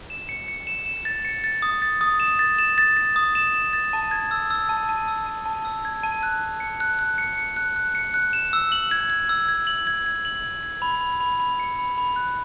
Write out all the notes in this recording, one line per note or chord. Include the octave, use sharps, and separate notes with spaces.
E7
C#7
C#7
E7
E7
A6
C#7
A6
D#6
A6
D#6
E7
A6
E7
A6
A6
D#6
E7
E7
A6
A5
G#6
E6
E6
A5
A5
E6
A5
A5
E6
G#6
A5
F#6
F#6
C#7
F#6
F#6
C#7
C#7
F#6
F#6
C#7
F#6
E7
E6
F#7
G#6
G#6
E6
G#6
F#7
G#6
G#6
F#7
G#6
G#6
B5
B5
B5
B5
C#7
B5
B5
F#6